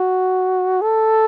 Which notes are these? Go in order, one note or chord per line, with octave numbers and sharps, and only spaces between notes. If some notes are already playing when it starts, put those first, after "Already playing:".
Already playing: F#4
A4